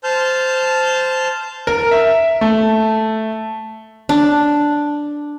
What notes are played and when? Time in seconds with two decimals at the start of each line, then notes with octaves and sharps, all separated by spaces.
0.04 C5 A5 F6 G6
1.67 A#4
1.91 E5
2.41 A3
4.09 D4